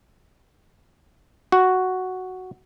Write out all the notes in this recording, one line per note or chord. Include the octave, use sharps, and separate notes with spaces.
F#4